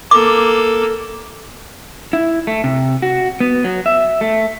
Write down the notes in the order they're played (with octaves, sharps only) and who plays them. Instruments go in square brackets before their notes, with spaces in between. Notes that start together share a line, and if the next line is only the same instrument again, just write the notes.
[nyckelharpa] A#3 A4 [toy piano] D6
[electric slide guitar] E4
A3
C3
F#4
B3
F#3
E5
A3